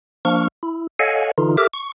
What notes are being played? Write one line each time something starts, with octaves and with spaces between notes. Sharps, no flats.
F3 A#3 D4 C#6 F6
E4
A4 C#5 D#5 F5 F#5 G#5
D3 E3 D#4 F4
G4 A4 A#4 E5 D6 F6
C#6